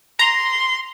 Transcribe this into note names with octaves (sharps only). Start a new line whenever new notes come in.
A#5 C6